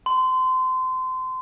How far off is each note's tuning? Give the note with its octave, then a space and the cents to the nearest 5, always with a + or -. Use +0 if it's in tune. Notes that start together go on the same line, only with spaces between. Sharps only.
C6 -25